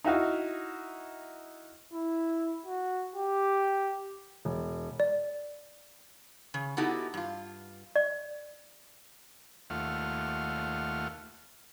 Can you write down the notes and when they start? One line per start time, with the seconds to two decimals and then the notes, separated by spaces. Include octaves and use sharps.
0.04 D#4 E4 F#4 F5
1.93 E4
2.66 F#4
3.16 G4
4.45 E1
5.00 D5
6.54 C#3
6.77 B3 D#4 E4 F#4 G4 A4
7.14 G2 F4
7.96 D5
9.70 D#2 A3 F4 F#5 F6